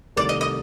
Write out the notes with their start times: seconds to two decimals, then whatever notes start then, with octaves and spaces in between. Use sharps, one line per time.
0.16 C2 C3 D#3 A3 D5
0.29 D#5
0.41 D#5